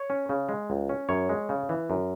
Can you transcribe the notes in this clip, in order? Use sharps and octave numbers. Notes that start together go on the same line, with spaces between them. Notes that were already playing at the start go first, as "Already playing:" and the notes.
Already playing: C#5
C#4
C#3
G#3
C#2
C#4
F#2 C#5
G#3
C#3
E3
F#2